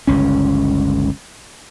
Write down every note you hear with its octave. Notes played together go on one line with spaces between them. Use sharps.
G1 C#2 C#4